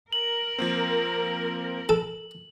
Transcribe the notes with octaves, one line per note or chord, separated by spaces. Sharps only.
A#4 F#7
F3 A#3 C4
A4